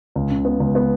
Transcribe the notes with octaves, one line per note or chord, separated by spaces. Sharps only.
C#2
C#3
B3
C#2
B3